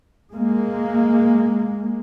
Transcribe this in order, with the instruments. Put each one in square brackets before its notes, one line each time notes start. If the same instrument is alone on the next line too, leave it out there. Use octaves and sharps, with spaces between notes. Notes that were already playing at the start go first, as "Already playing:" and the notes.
[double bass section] G#3 A#3